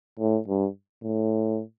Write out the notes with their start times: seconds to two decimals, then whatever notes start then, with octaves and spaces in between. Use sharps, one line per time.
0.19 A2
0.48 G2
1.03 A2